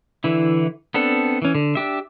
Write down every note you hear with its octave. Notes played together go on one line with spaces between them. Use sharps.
D3 E3 E4
B3 C4 D4 A4
E3 C#4
D3
D4 G4 E5